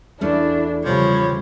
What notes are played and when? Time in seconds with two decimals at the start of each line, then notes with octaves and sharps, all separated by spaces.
0.21 E2 A3 C#4 D4 E4
0.85 C#3 F3 G3 C#5 B5